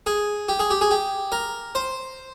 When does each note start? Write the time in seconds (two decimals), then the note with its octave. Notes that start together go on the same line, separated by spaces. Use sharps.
0.06 G#4
0.48 G4
0.59 G#4
0.70 G4
0.81 G#4
0.91 G4
1.32 A#4
1.75 C5